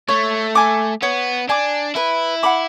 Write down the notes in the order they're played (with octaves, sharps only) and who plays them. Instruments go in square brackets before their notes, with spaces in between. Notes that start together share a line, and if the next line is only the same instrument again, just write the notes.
[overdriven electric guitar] A3 [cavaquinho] C#5
[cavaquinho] G#5 D6
[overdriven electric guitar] B3 [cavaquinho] C#5
[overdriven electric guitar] D4 [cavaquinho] G#5 D6
[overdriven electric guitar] E4 [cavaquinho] B4
[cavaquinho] F#5 B5 D6